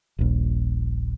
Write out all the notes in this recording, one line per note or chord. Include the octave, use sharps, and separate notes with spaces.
D#1 A#1